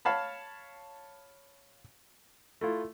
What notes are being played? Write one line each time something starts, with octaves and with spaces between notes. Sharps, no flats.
C#5 F5 A5 B5
A3 E4 F4